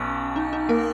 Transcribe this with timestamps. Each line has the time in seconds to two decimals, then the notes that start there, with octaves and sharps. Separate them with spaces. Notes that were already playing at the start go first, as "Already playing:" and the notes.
Already playing: B1 B2 C#4
0.36 D#4
0.53 D#4
0.69 A#3 A#4